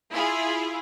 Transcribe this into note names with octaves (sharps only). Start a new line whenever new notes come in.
E4 F4 G#4